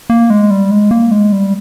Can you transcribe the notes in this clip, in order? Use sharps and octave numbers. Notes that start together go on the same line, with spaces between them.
A#3
G#3
G3
G#3
A#3
G#3
G3